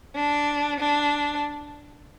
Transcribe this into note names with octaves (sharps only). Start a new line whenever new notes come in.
D4
D4